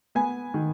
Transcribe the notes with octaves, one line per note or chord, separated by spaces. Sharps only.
B3 G#5
D#3